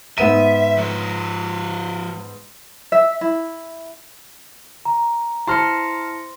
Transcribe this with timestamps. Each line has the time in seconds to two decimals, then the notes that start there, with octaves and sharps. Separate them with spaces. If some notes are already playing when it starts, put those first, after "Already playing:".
0.18 G#2 B3 E5 D#7
0.78 F3 C#5
2.92 E5
3.21 E4
4.85 A#5
5.47 E4 C5 A5 C6 F6 A#6 C#7